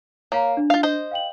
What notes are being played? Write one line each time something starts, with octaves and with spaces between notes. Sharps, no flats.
A#3 C#5 F5 A#5
D4
F4 F5
C5 D#5
F5 G5 F#7